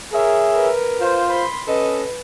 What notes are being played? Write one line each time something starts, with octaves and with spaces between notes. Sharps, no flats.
G#4 A#4 C#5 E5
A#4 B4
F4 C5
B5 C6
C#4 A4 B4 D#5